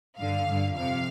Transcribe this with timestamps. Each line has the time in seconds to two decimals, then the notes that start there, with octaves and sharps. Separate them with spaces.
0.18 G2 D3 F5
0.46 G2 D3
0.74 F2 C3 F5